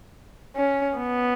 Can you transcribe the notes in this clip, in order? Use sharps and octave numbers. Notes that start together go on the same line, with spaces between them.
C#4
B3